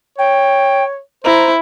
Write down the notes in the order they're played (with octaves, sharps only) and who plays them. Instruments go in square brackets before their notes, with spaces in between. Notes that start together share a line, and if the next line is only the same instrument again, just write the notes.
[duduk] C#5 [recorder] G5
[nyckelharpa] E4 [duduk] C5 [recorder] A#5